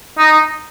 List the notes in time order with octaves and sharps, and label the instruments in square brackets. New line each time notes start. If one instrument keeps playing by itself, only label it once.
[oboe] D#4